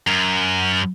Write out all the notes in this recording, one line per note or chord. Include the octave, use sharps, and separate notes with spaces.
F#2